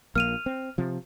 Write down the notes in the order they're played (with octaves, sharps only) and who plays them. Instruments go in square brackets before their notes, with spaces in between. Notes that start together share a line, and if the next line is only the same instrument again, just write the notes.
[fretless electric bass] A#1 A#3 [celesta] F6 D#7 F7
[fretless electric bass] C4
C3 F3